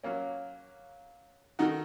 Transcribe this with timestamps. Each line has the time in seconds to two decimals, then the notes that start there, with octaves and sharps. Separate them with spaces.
0.04 F#3 A#3 C#4
1.59 D#3 A3 D#4 F#4